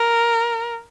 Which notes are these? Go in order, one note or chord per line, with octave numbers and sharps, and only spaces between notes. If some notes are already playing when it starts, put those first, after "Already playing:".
Already playing: A#4